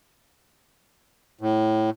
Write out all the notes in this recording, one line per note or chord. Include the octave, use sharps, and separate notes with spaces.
A2